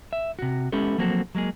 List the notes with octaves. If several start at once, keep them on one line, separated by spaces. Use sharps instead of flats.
E5
C3 F#4
G#3 B3 C#4 E4 G4 A4
F3 F#3 A#3 C4 F#4 A4
F#3 G#3 A#3 G#4